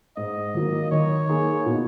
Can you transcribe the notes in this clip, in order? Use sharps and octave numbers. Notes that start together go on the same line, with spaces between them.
G#2 D#5
D#3 F#3 A#3
D#3 C#5
A#3 D#4 G#4
B2